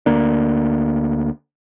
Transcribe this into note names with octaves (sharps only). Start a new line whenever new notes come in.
D2 A#3 D4